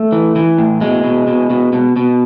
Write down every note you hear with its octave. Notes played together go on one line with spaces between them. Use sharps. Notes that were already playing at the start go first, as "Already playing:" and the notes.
Already playing: A3
E3
E3
A2
B2 G#3
B2
B2
B2
B2
B2